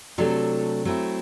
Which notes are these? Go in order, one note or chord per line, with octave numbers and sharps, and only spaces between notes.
C3 F#3 A3 D4 A4
F#3 A3 C4 E4